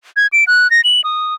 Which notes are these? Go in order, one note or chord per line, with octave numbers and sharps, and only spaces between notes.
G#6
D7
F#6
A#6
F#7
D#6